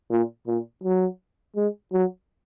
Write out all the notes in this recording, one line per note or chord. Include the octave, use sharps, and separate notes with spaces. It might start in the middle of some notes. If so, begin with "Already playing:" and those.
A#2
A#2
F#3
G#3
F#3